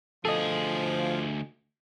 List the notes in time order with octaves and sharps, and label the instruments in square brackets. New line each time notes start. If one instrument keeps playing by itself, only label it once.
[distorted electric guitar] D2 G#4 [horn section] F3 [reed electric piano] A4 D#5